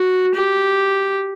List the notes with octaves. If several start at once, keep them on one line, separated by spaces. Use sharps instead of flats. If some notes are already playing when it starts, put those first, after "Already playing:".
Already playing: F#4
G4